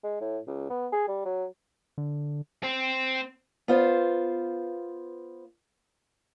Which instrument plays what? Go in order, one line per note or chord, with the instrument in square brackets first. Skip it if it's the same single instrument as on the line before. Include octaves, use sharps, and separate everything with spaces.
[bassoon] G#3
A2
C#2
B3
G#4
G3
F#3
[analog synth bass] D3
[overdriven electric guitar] C4
[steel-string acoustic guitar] B3 F4 C5 F5